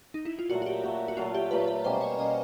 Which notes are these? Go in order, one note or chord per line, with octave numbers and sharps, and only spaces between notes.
D#4
E4
F4
A#2 F#3 A3 F#4
F#4
G4
A#2 F#3 A3
F#4
A#2 F#3 A3 F4
G4
A#2 F#3 A3 B4
B4
B2 G3 A#3 C#4 C5
C#5
B2 G3 A#3 C#4 D#5